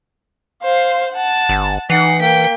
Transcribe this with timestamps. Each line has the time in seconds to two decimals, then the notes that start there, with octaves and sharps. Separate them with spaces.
0.63 C5 F5
1.13 F#5 A5
1.49 G1
1.90 E3 D#4 F#5 C7
2.21 A#3 G5 B6